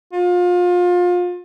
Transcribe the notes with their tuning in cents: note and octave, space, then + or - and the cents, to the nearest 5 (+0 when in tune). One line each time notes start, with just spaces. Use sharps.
F4 +30